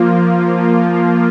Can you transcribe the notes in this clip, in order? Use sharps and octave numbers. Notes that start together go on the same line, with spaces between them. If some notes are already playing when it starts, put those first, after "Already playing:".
Already playing: F3 A#3 F4